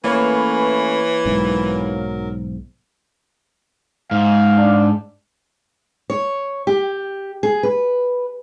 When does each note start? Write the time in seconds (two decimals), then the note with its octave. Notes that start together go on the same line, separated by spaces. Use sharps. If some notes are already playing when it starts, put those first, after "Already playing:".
0.04 E3 A3 A#3 C#4 B4 C#5
1.26 B1 G#2 F#3 A#4
4.11 G#2 F5
4.57 D4
6.10 C#5
6.67 G4
7.43 G#4
7.63 B4